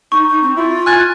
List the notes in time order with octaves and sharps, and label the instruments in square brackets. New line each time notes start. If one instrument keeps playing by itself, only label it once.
[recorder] D#4 [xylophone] C#6
[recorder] D#4
C4
[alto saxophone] E4 [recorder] F4
[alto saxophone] G#5 [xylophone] F6 F#6 A6